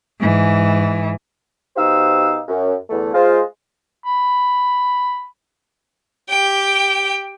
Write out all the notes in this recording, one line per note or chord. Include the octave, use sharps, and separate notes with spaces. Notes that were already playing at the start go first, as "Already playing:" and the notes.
G#2 E3
B2 D#4 G4 C5 F5 E6
F#2
E2 D3 A3
G#3 F4 C5
B5
G4 G5